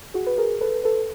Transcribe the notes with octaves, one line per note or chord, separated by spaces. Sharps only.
F#4 G#4
B4
G#4 A#4
A4 B4
A4 B4